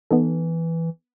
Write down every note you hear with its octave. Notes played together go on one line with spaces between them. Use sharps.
E3 B3 D#4 A4